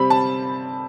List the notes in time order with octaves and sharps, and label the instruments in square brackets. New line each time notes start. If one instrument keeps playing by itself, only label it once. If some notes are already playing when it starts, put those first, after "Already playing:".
Already playing: [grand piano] C3 G3 C4 B5
A5